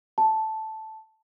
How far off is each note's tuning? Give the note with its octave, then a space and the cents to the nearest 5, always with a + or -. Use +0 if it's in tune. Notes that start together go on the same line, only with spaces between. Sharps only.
A5 -5